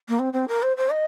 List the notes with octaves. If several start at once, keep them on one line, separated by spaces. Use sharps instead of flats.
A#3
C4
C4
A#4
C5
C5
D#5